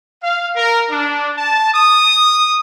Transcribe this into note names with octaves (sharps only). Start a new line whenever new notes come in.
F5
A#4
D4
A5
D#6